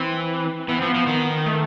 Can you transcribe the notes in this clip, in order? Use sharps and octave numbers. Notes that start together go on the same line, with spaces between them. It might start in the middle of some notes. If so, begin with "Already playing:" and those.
Already playing: E3 C4
E3 B3
F3 C4
B3
F3
D#3
A3